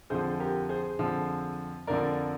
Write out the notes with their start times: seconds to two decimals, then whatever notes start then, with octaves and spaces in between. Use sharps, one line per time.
0.10 F2 D3 F3 G#4 C5
0.40 G4 A#4
0.69 G#4 C5
0.99 F2 D3 F3
1.87 F2 D3 F3 A#4 D5